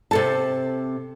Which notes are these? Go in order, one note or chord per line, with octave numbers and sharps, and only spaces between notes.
C3 A4 A5